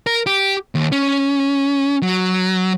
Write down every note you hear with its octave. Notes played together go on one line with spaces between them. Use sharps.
A#4
G4
D#2
C#4
F#3